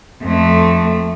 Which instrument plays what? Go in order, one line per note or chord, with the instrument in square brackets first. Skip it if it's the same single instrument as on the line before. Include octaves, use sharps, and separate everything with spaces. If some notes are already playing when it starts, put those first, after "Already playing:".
[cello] F2 A3